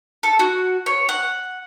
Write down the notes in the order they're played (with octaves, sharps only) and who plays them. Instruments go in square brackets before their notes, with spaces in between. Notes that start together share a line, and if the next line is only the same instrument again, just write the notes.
[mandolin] A4
F#4
C#5
F#5